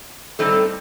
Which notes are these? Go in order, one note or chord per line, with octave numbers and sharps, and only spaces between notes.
A2 G3 C4 D#4 A4